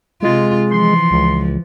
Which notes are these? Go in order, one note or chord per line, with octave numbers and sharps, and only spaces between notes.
C3 G#3 F4
E3 F3 C6
C#2